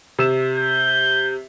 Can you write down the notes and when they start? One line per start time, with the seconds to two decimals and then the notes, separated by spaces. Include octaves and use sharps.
0.19 C3 E6 E7
0.57 G6